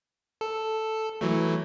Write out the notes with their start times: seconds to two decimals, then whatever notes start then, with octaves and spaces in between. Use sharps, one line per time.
0.41 A4
1.21 E3 F#3 A3